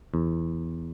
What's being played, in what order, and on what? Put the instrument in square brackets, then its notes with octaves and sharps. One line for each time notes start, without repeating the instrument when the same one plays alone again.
[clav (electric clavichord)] E2